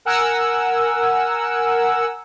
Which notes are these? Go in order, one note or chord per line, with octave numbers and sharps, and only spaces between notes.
A#4 F#5 G#5 E6